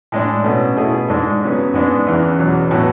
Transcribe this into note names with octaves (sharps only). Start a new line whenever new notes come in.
A2 G#3 D4
B2 A3 C#4
B2 A3 E4 G#4
G#2 G#3 D4 A4
F#2 C#3 F#3 B3
G#2 G#3 B3 D4
E2 C#3 E3
E2 B2 F#3
A2 F#3 B3 F#4